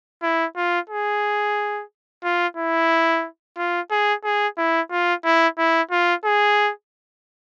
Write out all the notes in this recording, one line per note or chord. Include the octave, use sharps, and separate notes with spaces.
E4
F4
G#4
F4
E4
F4
G#4
G#4
E4
F4
E4
E4
F4
G#4